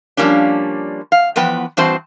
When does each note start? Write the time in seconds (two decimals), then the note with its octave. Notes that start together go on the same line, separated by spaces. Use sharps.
0.17 F3 G3 A#3 C#4 D4
1.12 F5
1.36 E2 F3 B3 B4 G5
1.77 G2 E3 C4 F#4 C5 A5